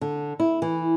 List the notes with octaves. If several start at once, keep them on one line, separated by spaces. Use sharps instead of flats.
D3
E4
E3